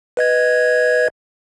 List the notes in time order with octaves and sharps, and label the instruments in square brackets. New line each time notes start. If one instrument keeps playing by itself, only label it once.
[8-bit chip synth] B4 D#5 G#6